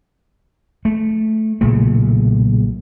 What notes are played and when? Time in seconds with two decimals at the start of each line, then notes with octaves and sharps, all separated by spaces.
0.85 A3
1.61 B1 A#2 C#3 A3